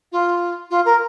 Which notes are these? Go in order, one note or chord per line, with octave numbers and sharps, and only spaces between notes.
F4
F4
A#4